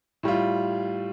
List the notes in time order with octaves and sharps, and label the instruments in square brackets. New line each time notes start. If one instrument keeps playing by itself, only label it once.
[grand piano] A2 G3 F4